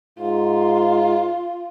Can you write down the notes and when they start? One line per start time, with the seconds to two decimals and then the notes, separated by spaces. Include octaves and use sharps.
0.19 G#2 F4